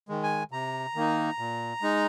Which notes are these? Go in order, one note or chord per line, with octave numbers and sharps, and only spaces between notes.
D#3 G#3
G#5
C3 A#5
D#3 A#3 D#4
A#2
G#3 D#4